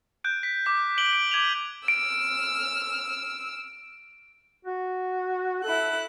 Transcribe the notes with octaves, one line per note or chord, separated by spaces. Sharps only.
F#6 G6 D7
B6
D6 B6
D6 D7 F#7 G7
D7
D6 G#6 D#7 F7
E6 F6 D7
F#4
E4 A4 F#6